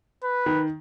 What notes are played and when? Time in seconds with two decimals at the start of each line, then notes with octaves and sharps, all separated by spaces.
0.24 B4
0.46 D#3